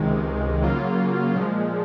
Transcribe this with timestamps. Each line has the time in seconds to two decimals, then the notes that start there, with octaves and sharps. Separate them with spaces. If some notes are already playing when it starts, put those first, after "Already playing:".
Already playing: C#2 C3 D#3 G#3
0.62 C#3 F#3 A#3 F4
1.35 A#2 F3 G#3